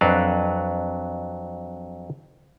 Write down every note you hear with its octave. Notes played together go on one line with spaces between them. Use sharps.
F2 F#3 D4 F#4 B4 F5